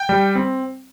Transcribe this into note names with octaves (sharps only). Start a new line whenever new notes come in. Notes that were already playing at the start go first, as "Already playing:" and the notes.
Already playing: G5
G3
C4